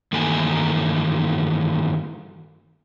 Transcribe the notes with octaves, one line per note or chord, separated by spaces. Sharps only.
G2 D#3 E3 A3 A#3 G#5